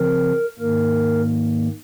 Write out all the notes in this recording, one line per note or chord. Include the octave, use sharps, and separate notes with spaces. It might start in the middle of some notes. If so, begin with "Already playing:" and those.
Already playing: C#3 F3 C4 A#4
G#2 D#3 A#3 A#4